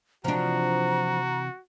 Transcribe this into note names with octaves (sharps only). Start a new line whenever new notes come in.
C3 E3 F3 D4 F#4 A#5